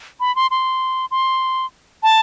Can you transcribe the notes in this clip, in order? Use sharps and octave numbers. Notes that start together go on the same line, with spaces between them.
B5
C6
C6
C6
A5